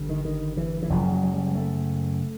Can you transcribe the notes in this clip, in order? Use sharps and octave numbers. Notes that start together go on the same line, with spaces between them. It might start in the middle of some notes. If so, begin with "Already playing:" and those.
Already playing: G1 G2 D3
D#3
D#3
E3
E3
F#1 F#2 C#3 F3
F3
F#3
F#3
G3
A3